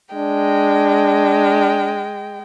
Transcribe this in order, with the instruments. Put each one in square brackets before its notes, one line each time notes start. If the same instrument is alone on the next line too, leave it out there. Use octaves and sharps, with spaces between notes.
[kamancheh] G#3 G5 [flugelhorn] D4